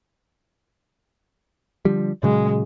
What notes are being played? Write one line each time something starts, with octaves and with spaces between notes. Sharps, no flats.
D3 F3 G3
A#2 C#3 F#3 G#3